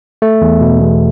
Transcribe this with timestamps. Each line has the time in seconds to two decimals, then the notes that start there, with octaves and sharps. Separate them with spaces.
0.22 A3
0.41 E2
0.61 B2
0.80 E2